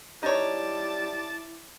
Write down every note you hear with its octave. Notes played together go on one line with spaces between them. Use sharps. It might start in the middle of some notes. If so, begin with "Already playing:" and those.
G3 D#4 E4 C#5 A5 D6